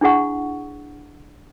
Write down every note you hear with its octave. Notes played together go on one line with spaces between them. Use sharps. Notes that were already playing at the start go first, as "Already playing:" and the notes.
D4 E4 G#4 F#5 C#6